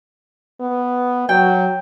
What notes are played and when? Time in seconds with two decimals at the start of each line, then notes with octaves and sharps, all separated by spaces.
0.60 B3
1.29 F#3 G5